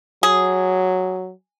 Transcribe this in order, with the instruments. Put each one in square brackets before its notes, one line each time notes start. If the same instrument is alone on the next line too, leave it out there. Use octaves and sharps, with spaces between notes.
[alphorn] F#3 [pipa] G#4